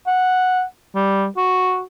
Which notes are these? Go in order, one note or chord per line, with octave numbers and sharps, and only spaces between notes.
F#5
G3
F#4